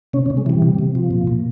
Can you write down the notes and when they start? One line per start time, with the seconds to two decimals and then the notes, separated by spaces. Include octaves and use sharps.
0.13 C3 C#4
0.26 C#4
0.30 C3
0.37 G#3
0.46 E3 G3
0.62 C3
0.79 C3
0.95 F3
1.11 A#2
1.27 A#2